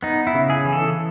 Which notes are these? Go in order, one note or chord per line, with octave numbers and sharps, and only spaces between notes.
B3 D#4
E4
C#3
G#4
E3
A4